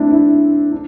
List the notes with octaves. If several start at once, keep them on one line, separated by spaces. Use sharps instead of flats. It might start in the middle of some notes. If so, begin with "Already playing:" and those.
Already playing: A3 C4 D4 E4
E4
D4